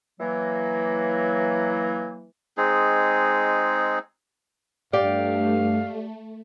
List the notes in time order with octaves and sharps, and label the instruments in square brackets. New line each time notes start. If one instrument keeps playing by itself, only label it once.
[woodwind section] E3 F#3 A#3
[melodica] G#3 C4 D#4 G#4
[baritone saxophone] G2 [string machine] A3 [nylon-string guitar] G4 D5 [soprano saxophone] F5